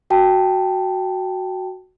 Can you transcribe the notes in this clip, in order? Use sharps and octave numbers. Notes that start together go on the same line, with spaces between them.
F#4 G5 A5